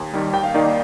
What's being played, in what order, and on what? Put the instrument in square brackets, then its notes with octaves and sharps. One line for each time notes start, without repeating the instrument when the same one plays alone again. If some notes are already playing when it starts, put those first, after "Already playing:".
Already playing: [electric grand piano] D#2
D#3 G3
[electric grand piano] D#2 [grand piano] G5
[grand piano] F5
[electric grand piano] D#3 A#3 D#4 [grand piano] D5